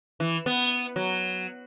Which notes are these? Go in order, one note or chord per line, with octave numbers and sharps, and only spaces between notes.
E3
B3
F#3